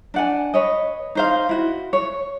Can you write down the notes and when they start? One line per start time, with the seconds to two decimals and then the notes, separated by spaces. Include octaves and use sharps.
0.14 D4 F#5 G#5
0.54 B4 C#5 D#5
1.15 D#4 C5 F5
1.49 E4 F#4
1.93 C#5